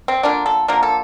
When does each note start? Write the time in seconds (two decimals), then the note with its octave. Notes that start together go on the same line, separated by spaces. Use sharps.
0.08 C4
0.23 D3 F3 A#3 D4
0.46 A4
0.68 D3 F3 A#3 A#4
0.83 A4